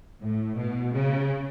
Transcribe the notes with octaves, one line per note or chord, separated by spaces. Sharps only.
A2
B2
C#3